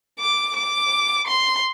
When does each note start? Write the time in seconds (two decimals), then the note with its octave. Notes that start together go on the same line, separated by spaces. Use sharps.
0.19 D6
0.56 D6
1.27 C6